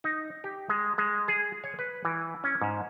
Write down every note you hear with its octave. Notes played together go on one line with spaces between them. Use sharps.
D#4
G4
G#3
G#3
G#4
C#5
B4
E3
C#4
G#2